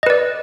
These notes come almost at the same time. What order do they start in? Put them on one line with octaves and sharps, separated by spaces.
D#5 B4 D5